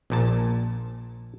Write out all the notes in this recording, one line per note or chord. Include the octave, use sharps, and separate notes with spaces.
A#1 A#2 A5